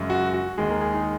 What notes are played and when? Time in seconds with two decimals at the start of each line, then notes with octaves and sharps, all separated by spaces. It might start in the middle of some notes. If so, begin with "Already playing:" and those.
Already playing: F#2 C#3 G#3
0.10 F#4
0.33 F#4
0.57 D#2 D#3 G#3 G#4
0.70 A#4
0.81 G#4
0.94 D#4